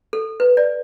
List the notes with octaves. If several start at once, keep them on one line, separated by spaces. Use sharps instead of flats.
A4
B4
D5